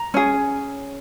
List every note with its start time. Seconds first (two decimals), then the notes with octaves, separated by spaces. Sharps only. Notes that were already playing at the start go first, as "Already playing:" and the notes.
Already playing: A#5
0.14 C#4 G#4